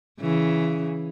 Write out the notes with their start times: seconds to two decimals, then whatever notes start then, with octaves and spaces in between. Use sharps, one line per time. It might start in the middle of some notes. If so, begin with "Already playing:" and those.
0.20 C#3 E3